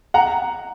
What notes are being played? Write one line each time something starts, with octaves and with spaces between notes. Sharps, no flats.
F#5 A#5